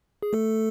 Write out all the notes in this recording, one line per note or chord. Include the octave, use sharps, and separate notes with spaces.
G#4
A3 A4